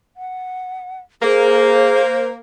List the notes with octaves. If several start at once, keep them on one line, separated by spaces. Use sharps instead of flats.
F#5
A#3 G#4 C5